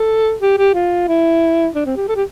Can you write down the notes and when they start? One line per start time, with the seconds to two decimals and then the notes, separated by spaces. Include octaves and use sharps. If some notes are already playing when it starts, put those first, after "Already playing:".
Already playing: A4
0.41 G4
0.58 G4
0.74 F4
1.08 E4
1.75 D4
1.86 C4
1.97 G4
2.08 A4
2.16 G4